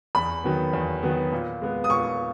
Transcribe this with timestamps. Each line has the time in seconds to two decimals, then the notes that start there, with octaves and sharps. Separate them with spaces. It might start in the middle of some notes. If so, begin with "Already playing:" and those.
0.15 E2 B5
0.44 D#3 F#3 B3
0.73 E2
1.03 D#3 F#3 B3
1.32 A#2
1.61 G#3 B3
1.84 D#6
1.90 A#2 C#6